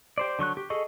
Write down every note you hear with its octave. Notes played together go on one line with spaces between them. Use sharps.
G4 C5 D5
D3 F#3 C#6 F#6
G4
G#4 A4 D#5 C#6